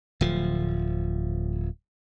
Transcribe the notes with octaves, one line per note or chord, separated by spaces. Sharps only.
D1 F3